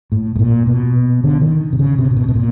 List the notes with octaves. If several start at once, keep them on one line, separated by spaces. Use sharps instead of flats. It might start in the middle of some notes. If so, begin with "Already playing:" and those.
A2
A2
A#2
B2
D3
D#3
C3
C#3
C3
C3
B2
B2
A#2